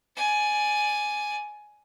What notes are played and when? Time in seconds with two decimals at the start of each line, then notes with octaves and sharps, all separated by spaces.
0.16 D5 G#5